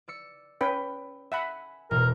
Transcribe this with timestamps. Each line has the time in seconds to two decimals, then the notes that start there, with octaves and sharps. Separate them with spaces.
0.08 D5 E6 C#7
0.61 C#4 B4 G5
1.32 E5 F#5 G#5 B5
1.91 E1 B2 A#4